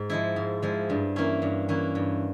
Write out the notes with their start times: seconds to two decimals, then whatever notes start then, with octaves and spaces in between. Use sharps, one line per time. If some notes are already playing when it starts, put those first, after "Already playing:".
Already playing: G#2
0.10 F3 G#3 E4
0.36 G#2
0.63 F3 G#3 E4
0.90 G2
1.16 E3 A#3 C#4 E4
1.42 G2
1.69 E3 A#3 C#4 E4
1.95 G2